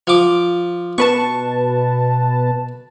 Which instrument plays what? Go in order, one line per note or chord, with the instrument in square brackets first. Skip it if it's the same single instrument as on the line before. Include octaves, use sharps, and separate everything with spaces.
[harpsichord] F3 D6
[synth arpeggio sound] B2 B4 A5 [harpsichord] C#6